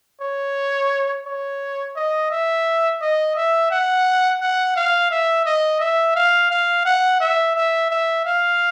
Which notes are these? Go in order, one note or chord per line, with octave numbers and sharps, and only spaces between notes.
C#5
C#5
D#5
E5
D#5
E5
F#5
F#5
F5
E5
D#5
E5
F5
F5
F#5
E5
E5
E5
F5